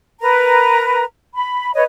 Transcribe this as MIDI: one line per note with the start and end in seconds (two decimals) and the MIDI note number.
0.21 1.03 70
0.21 1.03 71
0.21 1.03 82
1.35 1.71 83
1.75 1.83 71
1.75 1.83 73
1.75 1.83 75